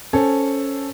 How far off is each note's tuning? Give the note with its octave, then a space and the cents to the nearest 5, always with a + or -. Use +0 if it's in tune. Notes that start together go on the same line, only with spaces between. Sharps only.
C#4 +0 A4 +0 C5 +5